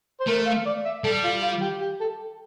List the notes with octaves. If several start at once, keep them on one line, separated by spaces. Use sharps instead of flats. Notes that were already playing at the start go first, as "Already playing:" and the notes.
C5
A3 A#4
F5
D5
E5
G3 A4
F4
F4
G4
G4
A4